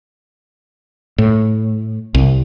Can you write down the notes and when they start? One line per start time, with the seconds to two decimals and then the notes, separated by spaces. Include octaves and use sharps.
1.18 A2
2.15 C2